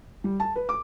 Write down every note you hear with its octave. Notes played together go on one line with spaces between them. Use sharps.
G3
A5
B4
D6